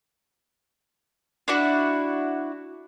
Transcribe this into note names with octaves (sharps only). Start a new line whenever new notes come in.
D4 E4 F#4